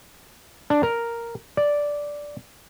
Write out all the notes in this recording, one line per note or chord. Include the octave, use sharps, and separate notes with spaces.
D4
A#4
D5